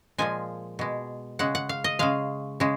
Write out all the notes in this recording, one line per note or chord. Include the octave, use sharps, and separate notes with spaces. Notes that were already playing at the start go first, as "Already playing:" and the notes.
A#2 F3 G#3 G#5
B2 G#3
C#3 G#3 F#5
F#5
F5
D#5
C#3 G#3 F5
C#3 G#3